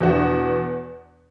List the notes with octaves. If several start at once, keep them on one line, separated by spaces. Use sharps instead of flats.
E2 B2 B3 D4 F#4